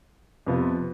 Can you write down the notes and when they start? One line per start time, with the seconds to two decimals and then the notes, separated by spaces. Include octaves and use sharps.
0.46 F2 C3 F3 B3